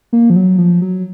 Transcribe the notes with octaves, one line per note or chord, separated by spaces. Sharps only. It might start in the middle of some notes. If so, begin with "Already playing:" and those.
A#3
F3
F#3
F3
F#3